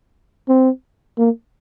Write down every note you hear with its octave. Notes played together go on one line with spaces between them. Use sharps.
C4
A#3